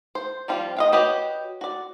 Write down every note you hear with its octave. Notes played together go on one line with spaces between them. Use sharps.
C5
F3 G3 C4 F4
D#5 F5 G5
F#4 G4 B4 C#5 D#5
F#4 D5